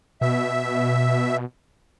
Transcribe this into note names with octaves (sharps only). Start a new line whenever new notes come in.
B2 E5